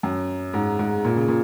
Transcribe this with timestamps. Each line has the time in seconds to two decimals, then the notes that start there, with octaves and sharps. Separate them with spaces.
0.03 F#2
0.54 G#2
0.79 G#2
1.05 A#2
1.16 C#3
1.28 A#2